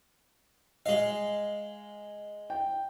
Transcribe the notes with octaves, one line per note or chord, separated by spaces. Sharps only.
G#3 D#5 F5
G5